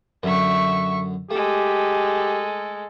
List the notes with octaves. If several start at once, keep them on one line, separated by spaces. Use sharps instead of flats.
F#2 D3 E5 C#6
G#3 A3 G4 A4